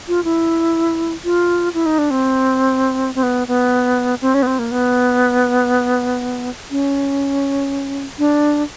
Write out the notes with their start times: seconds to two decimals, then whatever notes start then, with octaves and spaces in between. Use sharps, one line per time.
0.08 F4
0.24 E4
1.24 F4
1.74 E4
1.86 D#4
1.98 D4
2.10 C4
3.15 C4
3.23 B3
3.48 B3
4.21 C4
4.34 C#4
4.42 B3
4.47 C4
4.59 A#3
4.71 B3
6.71 C#4
8.19 D4